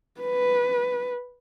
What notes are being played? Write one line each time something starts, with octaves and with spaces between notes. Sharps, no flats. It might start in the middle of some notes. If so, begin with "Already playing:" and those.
B4